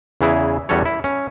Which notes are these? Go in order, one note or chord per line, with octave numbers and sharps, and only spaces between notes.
E2 C#3 E3 E4 G#4
E2 G3 C#4 F#4 A4 C#5
E4
C#4